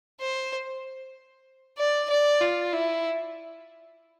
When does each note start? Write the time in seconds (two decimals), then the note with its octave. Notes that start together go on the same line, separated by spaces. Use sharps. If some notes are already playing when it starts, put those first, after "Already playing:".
0.21 C5
1.78 D5
2.10 D5
2.41 F4
2.73 E4